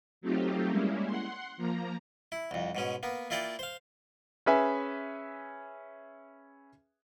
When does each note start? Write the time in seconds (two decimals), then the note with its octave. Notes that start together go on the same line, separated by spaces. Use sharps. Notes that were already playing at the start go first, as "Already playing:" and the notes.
0.21 F#3 A3 C4 D#4 F4 G4
0.68 G3 G#3 A#3 C#4 E4
1.05 F#5 C6
1.57 F3 A#3 A#5
2.32 E4
2.51 C2 F2
2.75 G#2 B2 C#4
3.03 A#3 B3
3.30 A#3 E4 F4 D5 G5
3.59 C5 F5
4.46 C#4 G#4 B4 E5 G#5